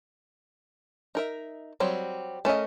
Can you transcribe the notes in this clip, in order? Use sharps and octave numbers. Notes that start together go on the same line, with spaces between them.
D#4 A#4 E5
F#3 G3 C4
A3 C#4 A#4 D#5